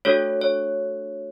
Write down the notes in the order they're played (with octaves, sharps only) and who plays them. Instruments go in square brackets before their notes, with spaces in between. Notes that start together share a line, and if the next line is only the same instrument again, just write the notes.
[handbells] A3 D4 F#4 A4 C#5
C#5